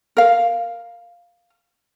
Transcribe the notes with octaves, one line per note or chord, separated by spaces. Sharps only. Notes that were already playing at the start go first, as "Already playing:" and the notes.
A#4 F5